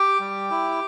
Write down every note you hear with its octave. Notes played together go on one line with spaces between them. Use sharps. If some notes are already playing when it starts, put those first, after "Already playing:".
Already playing: G4 G5
G3
E4